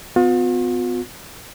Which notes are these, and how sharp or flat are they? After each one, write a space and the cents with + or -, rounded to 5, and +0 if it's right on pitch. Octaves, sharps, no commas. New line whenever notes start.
B3 +35 F4 +45